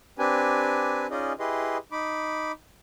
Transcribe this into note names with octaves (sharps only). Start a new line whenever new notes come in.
C4 D4 G4 B4 G#5
C#4 D#4 F4 G#4 D5 D#5
E4 G4 G#4 B4 D#5 C6
D#4 B5 D6